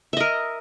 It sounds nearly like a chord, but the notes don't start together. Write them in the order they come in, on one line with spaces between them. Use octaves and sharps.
E5 D#5 A#4